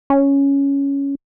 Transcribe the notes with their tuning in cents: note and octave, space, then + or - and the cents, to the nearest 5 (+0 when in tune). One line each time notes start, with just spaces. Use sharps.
C#4 +5